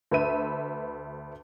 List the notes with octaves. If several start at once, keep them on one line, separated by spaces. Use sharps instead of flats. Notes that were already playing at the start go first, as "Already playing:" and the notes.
D2 B4 E5 D#7